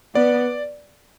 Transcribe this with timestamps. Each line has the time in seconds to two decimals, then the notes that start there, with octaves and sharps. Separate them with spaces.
0.15 B3 D5